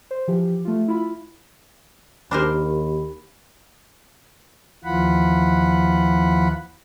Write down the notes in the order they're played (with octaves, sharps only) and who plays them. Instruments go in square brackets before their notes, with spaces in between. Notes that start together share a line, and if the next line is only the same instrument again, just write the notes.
[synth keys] C5
E3 F3 G4
A3 F4
E4 F4 B5
[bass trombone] D#2 [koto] D4 A#4 C5 [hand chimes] G4 B5
[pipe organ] D#2 E3 F3 F4 F#5 B5